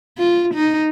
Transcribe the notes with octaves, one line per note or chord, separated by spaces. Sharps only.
F4
D#4